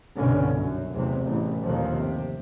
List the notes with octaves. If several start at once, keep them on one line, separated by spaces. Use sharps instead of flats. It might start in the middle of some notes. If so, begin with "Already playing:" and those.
G1 C2 B2 D3 C#4
F#2
A1 E2 C3 F#3
A1 E2
G1 D#2 A#2 F3
C3